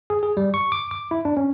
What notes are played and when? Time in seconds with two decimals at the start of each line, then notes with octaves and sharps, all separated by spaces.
0.10 G#4
0.23 G#4
0.37 G3
0.54 C#6
0.72 D6
0.91 D6
1.11 E4
1.25 D4
1.37 C#4